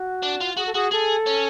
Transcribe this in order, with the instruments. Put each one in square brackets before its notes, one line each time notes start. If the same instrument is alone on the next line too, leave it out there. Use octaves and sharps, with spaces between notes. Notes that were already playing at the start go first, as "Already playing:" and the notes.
Already playing: [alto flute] F#4
[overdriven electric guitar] D4
F4
[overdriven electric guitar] F#4 [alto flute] G#4
[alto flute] A4
[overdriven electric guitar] F#4 [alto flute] G#4
[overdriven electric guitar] G#4 [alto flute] A4
[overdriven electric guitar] C#4